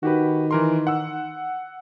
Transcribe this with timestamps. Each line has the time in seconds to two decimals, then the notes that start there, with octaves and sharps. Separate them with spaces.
0.03 D#3 F#4 G4 B4
0.51 E3 A#4 C6
0.87 F#5 E6